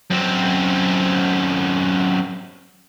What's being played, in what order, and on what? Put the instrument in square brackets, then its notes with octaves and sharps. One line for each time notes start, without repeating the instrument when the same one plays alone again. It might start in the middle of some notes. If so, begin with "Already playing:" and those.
[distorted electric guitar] F#2 C4